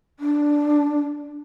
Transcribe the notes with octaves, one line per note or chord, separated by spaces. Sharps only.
D4